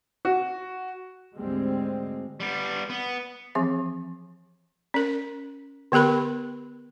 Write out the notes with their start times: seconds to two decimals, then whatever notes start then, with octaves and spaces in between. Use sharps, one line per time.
0.25 F#4
1.38 D2 G#2 D3 G3 G#3 C4
2.40 G3 B3
2.90 B3
3.55 E3 F3 C4 G#4 E5
4.94 C#4 A#4
5.92 D3 B3 G4 A#4 B5